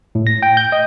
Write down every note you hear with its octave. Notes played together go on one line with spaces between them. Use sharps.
A2
A#6
G5
G6
D#5